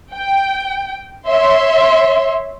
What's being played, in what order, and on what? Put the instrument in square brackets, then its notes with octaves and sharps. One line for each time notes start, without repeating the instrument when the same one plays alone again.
[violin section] G5
C#5 E5 C6